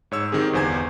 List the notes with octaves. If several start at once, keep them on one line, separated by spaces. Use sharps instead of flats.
G#2 C#5 E6
D#3 C4 G4 G#4
G1 E2 C5 G#5 G#6